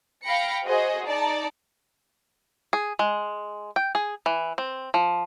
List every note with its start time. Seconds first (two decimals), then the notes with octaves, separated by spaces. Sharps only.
0.24 F5 G5 B5 A#6 C#7
0.66 F#4 G#4 C5 D#5
1.07 D#4 D5 A5
2.73 G#4
2.99 G#3
3.76 G5
3.95 G#4
4.26 E3
4.58 C4
4.94 F3